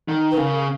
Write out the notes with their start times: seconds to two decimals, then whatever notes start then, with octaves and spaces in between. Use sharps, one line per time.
0.08 D#3
0.31 B4
0.37 C#3 A#4